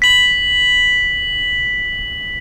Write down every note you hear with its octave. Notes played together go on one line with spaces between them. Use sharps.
B6 F#7